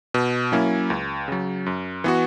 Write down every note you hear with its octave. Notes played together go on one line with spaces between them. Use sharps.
B2
F#3 A#3 C#4 E4
C#2
C#3 F#3
F#2
E3 B3 F#4